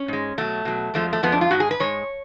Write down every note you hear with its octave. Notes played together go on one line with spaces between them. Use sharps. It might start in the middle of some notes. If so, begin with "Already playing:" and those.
Already playing: C#4
G#2 G#3
B2 F#3 A3
B2 F#3
F2 F3 G#3 A3
A3
F2 F3 G#3 B3
D4
F4
G#2 G#3 F#4
G#4
B4
G#2 G#3 C#5